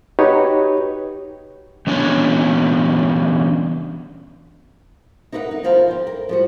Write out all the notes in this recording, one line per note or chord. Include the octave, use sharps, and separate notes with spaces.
D#4 F#4 G4 B4 C#5
E3 B3 C#4 D4 E5 G#5
D#4 A#4 B4 D5 F#5
D#4
D2 B2 F3 A#4 F5
C5 G5
A#4
F3 G3 F#4